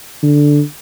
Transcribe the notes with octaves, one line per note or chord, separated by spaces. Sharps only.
D3